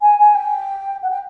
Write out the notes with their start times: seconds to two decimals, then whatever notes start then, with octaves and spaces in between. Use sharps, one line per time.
0.01 G#5
0.18 G#5
0.35 G5
1.02 F#5
1.10 G5